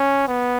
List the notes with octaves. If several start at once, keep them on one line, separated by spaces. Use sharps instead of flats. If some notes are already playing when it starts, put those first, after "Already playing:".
Already playing: C#4
B3